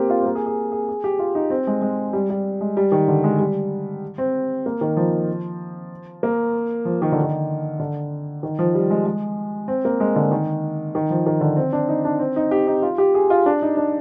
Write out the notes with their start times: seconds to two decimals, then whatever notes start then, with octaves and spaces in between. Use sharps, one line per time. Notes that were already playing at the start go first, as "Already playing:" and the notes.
Already playing: A#3 C4 G4
0.10 F4
0.20 C4
0.26 A#3
0.35 G#4
0.46 G#4
0.72 G#4
0.88 G#4
1.04 G4
1.19 F4
1.35 D#4
1.50 C4
1.67 G#3
1.82 G#3
2.13 G3
2.30 G3
2.61 G#3
2.77 G3
2.92 D#3
3.08 D3
3.24 G#3
3.39 G3
4.18 C4
4.66 A#3
4.81 D#3
4.97 F3
6.23 A#3
6.85 F3
7.02 D#3
7.12 D3
7.22 D#3
7.79 D3
8.43 D#3
8.59 F3
8.75 G3
8.90 G#3
9.06 G#3
9.68 C4
9.85 A#3
10.00 G#3
10.16 D3
10.31 D#3
10.95 D#3
11.10 F3
11.26 D#3
11.41 D3
11.57 C4
11.73 D4
11.89 D#4
12.05 D4
12.19 C4
12.36 D#4
12.51 G4
12.67 D#4
12.82 F4
12.98 G4
13.14 G#4
13.30 F4
13.46 D4
13.62 D#4
13.77 D4